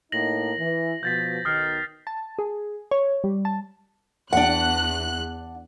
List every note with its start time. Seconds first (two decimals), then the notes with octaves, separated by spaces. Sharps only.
0.12 A2 A#3 D#4 A#6 F#7
0.59 E3
1.03 B2 F3 G6 A6 B6
1.45 B1 D#3 D#6 F6 C7
2.07 A5
2.39 G#4
2.91 C#5
3.24 G3
3.45 A5
4.33 E2 D4 F#5 F#6